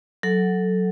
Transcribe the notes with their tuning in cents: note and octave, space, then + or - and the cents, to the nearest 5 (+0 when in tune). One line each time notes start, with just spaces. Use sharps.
F#3 +0 A4 +0 F#5 +0